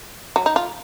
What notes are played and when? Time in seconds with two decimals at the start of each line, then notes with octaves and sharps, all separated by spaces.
0.36 F#3
0.46 D#4
0.56 F4